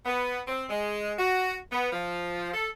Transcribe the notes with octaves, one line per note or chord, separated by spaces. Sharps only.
B3
C4
G#3
F#4
B3
F3
A4